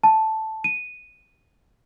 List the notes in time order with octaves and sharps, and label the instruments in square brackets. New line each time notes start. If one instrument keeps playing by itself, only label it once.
[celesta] A5
D#7